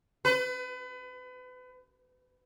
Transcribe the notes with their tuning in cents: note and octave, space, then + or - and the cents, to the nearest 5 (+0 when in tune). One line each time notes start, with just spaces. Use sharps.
B4 +35